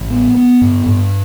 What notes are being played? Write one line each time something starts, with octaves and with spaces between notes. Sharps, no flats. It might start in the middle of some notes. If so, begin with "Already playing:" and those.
Already playing: A1
B3
B3
G2
G2